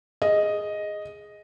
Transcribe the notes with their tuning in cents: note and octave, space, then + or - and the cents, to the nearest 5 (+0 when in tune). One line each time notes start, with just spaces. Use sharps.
G#4 +0 D#5 +0